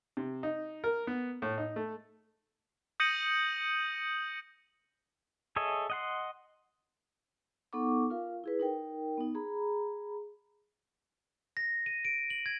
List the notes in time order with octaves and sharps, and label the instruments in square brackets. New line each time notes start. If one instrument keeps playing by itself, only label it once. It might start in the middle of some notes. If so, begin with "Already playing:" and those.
[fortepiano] C3
D#4
A#4
B3
A2
D#4
A3
[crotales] D#6 G6 A#6 C#7 D#7 F#7
[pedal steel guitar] G#4 A4 C#5 D#5 E5
D#5 F#5 C6
[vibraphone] B3 D#4 A4 F#5 C#6 D6
F4 A#4 F5
E4 G#4 B4
D#4 A#4 G5
B3 D#4
G#4 A#5 B5
[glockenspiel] A#6
D#7
D7
F#7
G#6